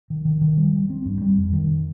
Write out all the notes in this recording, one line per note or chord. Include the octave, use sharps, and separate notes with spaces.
D#3
D#3
D#3
G3
G3
C4
G2
G3
F2
D#3